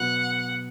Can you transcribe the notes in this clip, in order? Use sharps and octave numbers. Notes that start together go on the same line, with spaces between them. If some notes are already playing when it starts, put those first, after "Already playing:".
Already playing: B2 F#3 B3 F#4 F#5